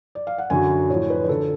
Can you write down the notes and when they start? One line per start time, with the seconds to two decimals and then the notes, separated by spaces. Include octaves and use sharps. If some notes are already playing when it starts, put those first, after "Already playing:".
0.15 D5
0.27 F5
0.38 F#5
0.50 F#2 D3 F#3 G#5
0.90 A2 F3 C#5
1.10 B4
1.24 B4
1.29 D3 F3 A4